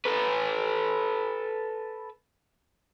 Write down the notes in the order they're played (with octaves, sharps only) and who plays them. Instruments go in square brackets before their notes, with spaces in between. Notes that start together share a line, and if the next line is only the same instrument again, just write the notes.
[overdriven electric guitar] A4 B4